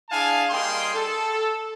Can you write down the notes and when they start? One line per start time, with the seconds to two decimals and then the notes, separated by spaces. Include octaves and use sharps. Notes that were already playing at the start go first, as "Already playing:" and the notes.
0.10 D4 E4 G#4 F5 G#5 A5
0.50 G3 A#3 D#4 G#4 G5 C6
0.94 A4